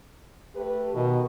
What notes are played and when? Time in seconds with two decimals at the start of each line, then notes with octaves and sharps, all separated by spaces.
0.55 A3 G4 B4
0.95 B2 D#3